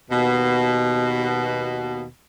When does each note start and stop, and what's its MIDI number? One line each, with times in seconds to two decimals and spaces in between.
0.11 2.07 39
0.11 2.07 47